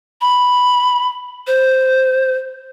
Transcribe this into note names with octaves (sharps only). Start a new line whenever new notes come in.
B5
C5